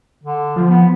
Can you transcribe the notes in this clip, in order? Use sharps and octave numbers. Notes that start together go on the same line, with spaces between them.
D3
F3
B3